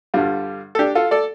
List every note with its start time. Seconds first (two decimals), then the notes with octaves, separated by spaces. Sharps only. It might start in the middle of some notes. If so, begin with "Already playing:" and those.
0.14 G2 D3 G3 F4
0.75 A4
0.79 D4 G4
0.95 F4 A4
1.11 A4 D5